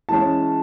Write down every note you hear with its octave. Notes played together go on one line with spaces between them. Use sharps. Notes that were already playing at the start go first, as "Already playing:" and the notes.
E3 G#3 C#4 A5